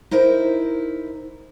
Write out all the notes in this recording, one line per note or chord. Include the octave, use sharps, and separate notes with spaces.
D#4 E4 A#4 C5 E5